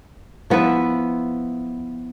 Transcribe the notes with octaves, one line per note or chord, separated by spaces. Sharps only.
F3 B3 E4 B4